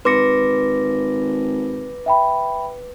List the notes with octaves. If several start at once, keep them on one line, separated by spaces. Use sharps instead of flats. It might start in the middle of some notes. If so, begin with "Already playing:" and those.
G#1 B4 C6 D6 A#6 C#7
E5 G5 B5